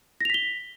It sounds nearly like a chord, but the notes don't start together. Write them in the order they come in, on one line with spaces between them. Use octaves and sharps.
A#6 F7 B6 G7